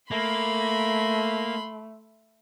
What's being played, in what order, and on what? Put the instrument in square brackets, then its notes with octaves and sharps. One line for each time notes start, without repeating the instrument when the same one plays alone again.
[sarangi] A3 [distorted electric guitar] A#3 [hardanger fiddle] B5 C6